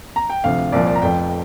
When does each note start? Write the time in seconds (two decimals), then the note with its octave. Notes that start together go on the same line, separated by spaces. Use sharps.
0.16 A#5
0.30 G5
0.44 D2 C3 F3 F5
0.72 C2 A#2 F3 D5
0.87 D5
0.95 A#5
1.02 F1 F2 F3 G5